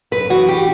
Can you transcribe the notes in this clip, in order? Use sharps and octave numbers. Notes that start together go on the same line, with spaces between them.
F#2 B4
E3 F#4
G4